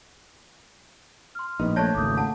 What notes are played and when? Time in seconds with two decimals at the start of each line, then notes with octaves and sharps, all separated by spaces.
1.35 C6 F6
1.60 A#1 A2 B3 D#4
1.76 A3 A#3 C#5 A5 F#6 G#6 A#6
1.95 G#1 C#2 D6 D#6 G6
2.17 F#5 A5